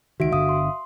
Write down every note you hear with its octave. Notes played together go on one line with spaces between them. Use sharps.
C#2 D#3 F#4 E5 D7
G1 D3 E5 F5 D#6
C6